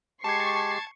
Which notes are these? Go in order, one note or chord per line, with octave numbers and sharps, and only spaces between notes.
G#3 G4 A5 C#6 G#6 C7